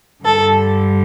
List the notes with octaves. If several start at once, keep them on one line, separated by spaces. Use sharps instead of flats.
G2 D3 G3 A4